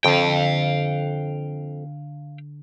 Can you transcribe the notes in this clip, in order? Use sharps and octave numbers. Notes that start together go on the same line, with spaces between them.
F2 D3 F5 G5